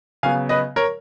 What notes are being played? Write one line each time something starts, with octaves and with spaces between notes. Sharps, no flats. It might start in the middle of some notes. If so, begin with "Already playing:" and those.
C#3 F#3 B3 F5 G#5
B4 D#5
A#4 C#5